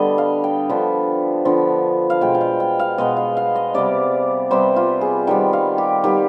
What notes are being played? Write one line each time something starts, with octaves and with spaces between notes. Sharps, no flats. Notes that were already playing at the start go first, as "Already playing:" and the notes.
Already playing: D3 G3 B3 D#5
F5
G5
D3 F3 B3
D3 F3 B3
F5
B2 G#3 B3 G5
G5
F5
G5
F5
B2 G#3 B3 D#5
F5
F5
D#5
C3 G3 B3 D5
C3 G3 B3 C5
F4
G#4
D#3 G3 B3 G5
F5
G4
D#3 G3 B3 G4